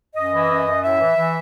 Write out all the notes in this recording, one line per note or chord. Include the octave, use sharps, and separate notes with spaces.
F#2 D#5
E3
F#2
F#2
A2 E5
E3
E3